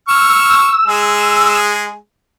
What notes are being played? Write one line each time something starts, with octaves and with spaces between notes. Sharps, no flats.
C#6 E6 F6
G#3 G#4